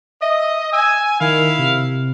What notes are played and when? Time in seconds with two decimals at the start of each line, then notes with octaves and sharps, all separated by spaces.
0.22 D#5 E5
0.73 G#5 E6
1.21 D#3 E4 F5
1.59 C3